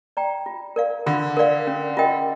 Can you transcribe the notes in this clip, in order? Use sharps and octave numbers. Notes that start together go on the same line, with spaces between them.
D5 G5 A#5
F4
A#4 D5 F5
D3 F4
A#4 D5 F5
C#4
F4 A#4 D#5 G5